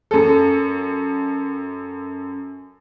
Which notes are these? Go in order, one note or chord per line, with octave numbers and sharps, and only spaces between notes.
F#2 A4